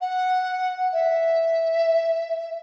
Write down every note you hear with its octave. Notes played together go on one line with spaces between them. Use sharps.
F#5
E5